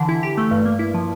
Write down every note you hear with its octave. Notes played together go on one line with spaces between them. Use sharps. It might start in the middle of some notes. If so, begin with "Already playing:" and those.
Already playing: D3 E3
E4
G4
A3
G2
A#3
E4
F3